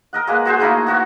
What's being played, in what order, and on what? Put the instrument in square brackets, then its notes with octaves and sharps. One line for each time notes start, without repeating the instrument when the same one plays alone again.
[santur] A#4 D#5 F#5
G#3 A#3 B4
F#4 G#4 C5
A3 A#3 D#4 E4
B3 F#4 C#5 F#5